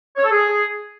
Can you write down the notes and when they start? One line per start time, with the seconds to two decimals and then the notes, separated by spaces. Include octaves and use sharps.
0.17 C#5
0.24 A4
0.31 G#4